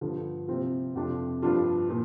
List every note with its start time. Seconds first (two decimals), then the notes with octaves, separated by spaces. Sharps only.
0.01 G2 D3 F3
0.48 C3 F3 C4 F4
0.96 F2 C3 F3 D4 F4
1.42 G2 F3 D4 F4
1.89 A#2 F3